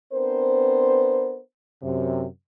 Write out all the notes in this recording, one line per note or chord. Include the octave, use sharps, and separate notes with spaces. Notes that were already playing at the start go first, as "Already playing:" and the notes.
B3 C4 D4 A#4 C5
F#2 C3